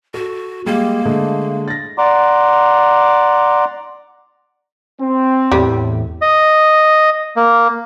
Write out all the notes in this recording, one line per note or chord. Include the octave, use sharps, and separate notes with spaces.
F#4 A4
G3 G#3 A#3
D3 G#3 A3
A6 A#6
D5 F#5 A#5 C6 D6
C4
E2 A2 G3
D#5
A#3